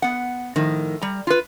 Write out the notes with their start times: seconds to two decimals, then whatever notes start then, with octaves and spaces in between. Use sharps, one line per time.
0.02 B3 F#5
0.56 A2 D#3 F3
1.02 G3 A#5
1.27 F4 B4